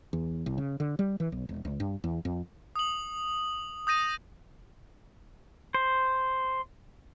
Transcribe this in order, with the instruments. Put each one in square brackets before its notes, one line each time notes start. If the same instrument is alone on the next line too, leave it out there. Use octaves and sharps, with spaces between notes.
[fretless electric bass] E2
C2
C#3
D3
G3
E3
B1
E1
C#2
G2
E2
F2
[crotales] D#6 F#7
D#6 G6 A#6 D#7
[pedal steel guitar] C5